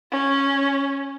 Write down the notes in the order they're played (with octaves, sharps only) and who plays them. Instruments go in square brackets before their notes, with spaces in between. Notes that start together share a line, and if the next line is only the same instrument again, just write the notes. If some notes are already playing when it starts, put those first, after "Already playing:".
[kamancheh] C#4